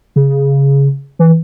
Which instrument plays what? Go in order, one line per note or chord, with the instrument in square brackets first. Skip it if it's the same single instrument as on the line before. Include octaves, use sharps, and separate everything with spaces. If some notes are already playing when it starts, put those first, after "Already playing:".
[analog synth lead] C#3
E3